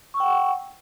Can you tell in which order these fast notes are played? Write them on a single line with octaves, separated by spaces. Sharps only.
C#6 E6 G5 F#5